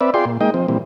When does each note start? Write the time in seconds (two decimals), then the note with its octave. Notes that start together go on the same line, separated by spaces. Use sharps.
0.01 C4 B4 D5 E5
0.14 F4 G#4 D5 G5 C6
0.25 A#2
0.41 G#3 A#3 D#4 D#5 G5
0.54 F3 C4
0.68 A#2 E3 G3 C4